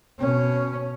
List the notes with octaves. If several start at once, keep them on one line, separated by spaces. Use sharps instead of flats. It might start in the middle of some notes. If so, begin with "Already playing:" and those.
B2 C#4